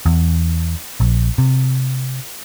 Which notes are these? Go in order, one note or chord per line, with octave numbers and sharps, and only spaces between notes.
E2
A#1
C3